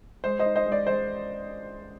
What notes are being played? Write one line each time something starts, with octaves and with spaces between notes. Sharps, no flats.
G#3 C5
C5 D#5
D#4
C5 D#5
G#3
D5
G#3 C5